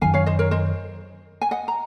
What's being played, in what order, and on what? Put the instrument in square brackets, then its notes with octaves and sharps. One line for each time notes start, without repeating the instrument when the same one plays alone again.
[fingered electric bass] F#2 D#3 F#3 [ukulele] F5 G#5
[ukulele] C#5 F5
C5 D#5
A#4 C#5
C5 D#5
G#5
D#5 F#5
A#5